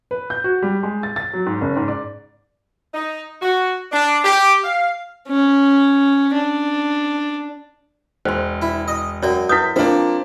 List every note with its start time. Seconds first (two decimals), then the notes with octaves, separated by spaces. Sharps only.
0.11 B4
0.30 G6
0.44 F#4
0.62 G3
0.83 G#3
1.03 A6
1.16 A6
1.33 F#3
1.46 G#2
1.61 F#1
1.76 G#2
1.88 D5
2.94 D#4
3.42 F#4
3.92 D4
4.25 G4
4.64 F5
5.28 C#4
6.33 D4
8.25 E1 C5 C6
8.62 E4
8.88 D#5
9.23 F#2 C#5 D5 G5
9.49 E4 B4 D#6 G6 B6
9.76 F3 A#3 C4 D4